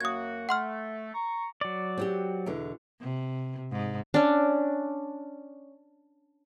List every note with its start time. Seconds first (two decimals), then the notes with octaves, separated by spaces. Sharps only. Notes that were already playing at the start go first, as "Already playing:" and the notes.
0.01 F#2 A#3 F#4 D#6 G#6
0.49 A3 F#5 C6 F6
1.14 A#5 C#6
1.61 F#3 D5
1.98 C4 F#4 G4
2.46 E2 B2 D3
3.01 C3
3.72 G#2
4.14 C#4 D4